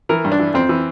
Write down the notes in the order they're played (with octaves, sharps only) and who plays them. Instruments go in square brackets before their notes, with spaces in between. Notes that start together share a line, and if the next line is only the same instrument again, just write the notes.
[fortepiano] E3 A#4
G2
D4
E3
F2 C4
E3